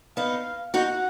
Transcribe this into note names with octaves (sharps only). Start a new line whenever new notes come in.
B3 D#4 F5
D#4 F#4 F#5